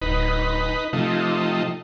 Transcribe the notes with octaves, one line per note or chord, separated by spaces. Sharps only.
D1 D#4 B4
C3 F3 A3 D#4